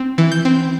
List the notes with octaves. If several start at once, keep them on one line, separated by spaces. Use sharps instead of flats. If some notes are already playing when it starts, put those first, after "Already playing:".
Already playing: C4
E3
G6
C4